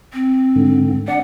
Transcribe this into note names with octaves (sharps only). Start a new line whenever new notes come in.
C4
G#2 D3
D4 D5 F#5